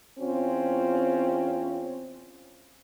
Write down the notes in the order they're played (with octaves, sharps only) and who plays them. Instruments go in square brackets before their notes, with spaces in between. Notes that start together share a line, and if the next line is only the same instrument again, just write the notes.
[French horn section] E2 C4 C#4 F4